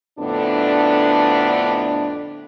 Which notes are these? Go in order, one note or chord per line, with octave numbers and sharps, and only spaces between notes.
F2 A2 D3 B3 D4